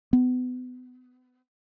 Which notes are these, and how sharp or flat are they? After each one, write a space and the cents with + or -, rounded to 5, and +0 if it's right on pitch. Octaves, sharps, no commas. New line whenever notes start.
B3 +30